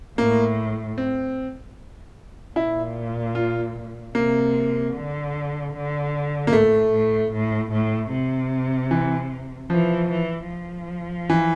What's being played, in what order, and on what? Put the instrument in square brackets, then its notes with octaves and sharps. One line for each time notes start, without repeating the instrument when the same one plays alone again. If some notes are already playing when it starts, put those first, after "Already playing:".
[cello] A2 [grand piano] A#3
[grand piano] C4
[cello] A#2 [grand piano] E4
[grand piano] F4
[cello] C3 [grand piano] A#3
[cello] D3
D3
[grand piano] A#3
[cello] A2 [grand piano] A3
[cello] A2
A2
A2
C3
[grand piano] E3
[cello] E3 [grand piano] F3
[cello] E3
F3
[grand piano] E3